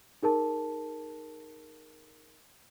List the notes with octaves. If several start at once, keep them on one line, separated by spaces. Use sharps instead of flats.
D#4 G#4 A#4 A5